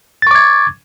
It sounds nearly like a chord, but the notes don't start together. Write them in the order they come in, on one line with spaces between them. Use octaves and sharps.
A6 C#6 D6 G#6